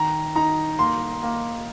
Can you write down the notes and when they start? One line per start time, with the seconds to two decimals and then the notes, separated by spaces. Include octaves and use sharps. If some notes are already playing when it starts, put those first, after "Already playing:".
Already playing: D#3 A#5
0.35 D#4 A#5
0.79 A#3 C6
1.23 A#3